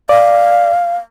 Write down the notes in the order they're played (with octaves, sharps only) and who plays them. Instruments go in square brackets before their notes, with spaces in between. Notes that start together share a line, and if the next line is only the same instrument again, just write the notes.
[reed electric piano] D5 [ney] F5